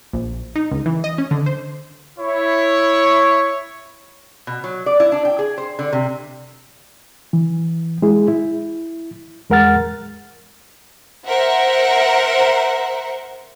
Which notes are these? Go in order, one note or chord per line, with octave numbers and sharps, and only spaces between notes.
A#1
D#4
C#2
E3
D#5
C#4
D3
C5
E4 C#5
B2
F#3
D5
E4
D4
G5
G#4
C5
D3
C3
E3
G#3 E4 G#4
E4
E2 G#3 A#4 F#5 F6 A6
A#4 C5 E5 F#5